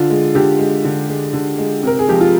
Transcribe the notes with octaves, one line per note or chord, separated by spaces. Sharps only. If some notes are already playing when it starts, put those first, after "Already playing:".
Already playing: D3 F4
G#3
D3 G4
G#3
D3
G#3
D3
G#3
C3 A#4
G#4
F3 G#3 G4
F4